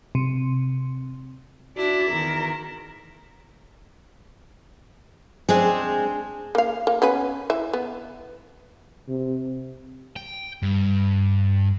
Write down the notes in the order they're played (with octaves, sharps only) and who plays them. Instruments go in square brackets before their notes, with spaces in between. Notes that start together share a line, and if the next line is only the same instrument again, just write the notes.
[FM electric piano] C3
[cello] D4 [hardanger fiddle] E4 [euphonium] F#4
[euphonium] E2 [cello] D#3 A#4
[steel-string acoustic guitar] G#3 C4 [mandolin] D4 G#4 G#5
[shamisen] A#3 F5
A#3
B3 C#4 B4
E3 E5
B3
[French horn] C3
[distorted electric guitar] G5
G2